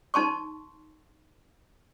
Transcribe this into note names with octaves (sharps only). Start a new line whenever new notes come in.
D#4 A5 C6 C#6